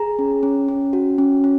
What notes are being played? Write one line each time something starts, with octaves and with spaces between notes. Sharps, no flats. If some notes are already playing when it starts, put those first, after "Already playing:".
Already playing: G#4 A#5
C#4
C#4
C#4
F#4
C#4
C#4